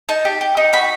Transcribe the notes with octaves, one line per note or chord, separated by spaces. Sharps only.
D#4 A5
G4
G4
D#4
F#4 B5